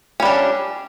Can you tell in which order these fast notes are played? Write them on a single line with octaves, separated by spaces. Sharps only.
C#4 G3 D4